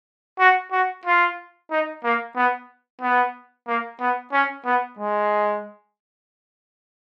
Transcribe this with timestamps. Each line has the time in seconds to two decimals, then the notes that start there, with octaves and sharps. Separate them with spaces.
0.39 F#4
0.72 F#4
1.05 F4
1.71 D#4
2.04 A#3
2.36 B3
3.01 B3
3.67 A#3
4.00 B3
4.32 C#4
4.65 B3
4.99 G#3